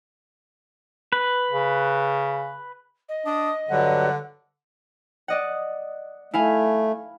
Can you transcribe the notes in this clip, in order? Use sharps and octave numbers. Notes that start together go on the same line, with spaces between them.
B4
C#3
D#5
D4 D#6
G2 D3 F#3 G3 F#5
D5 D#5 F#5
A3 E4 F5 G#5